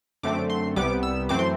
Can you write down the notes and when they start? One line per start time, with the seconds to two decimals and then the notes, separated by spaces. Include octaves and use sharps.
0.23 F#2 D3 A3 C4 D6
0.50 C6
0.76 C2 C3 G3 B3 D6
1.03 E6
1.29 F#2 E3 A3 C4 D6
1.39 C6